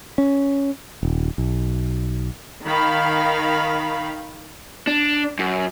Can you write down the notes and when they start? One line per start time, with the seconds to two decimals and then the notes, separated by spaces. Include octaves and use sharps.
0.18 C#4
1.03 D#1
1.38 B1
2.65 D#3 F5 B5
4.87 D4
5.39 F#2